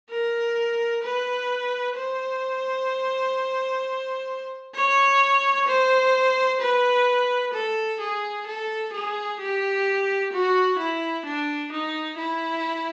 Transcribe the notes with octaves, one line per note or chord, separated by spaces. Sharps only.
A#4
B4
C5
C#5
C5
B4
A4
G#4
A4
G#4
G4
F#4
E4
D4
D#4
E4